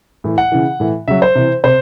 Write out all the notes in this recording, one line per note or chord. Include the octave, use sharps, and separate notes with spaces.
A2 E3
F#5
C#3 E3
A2 E3
C#3 F#3 E5
C5
C3 E3
C3 C5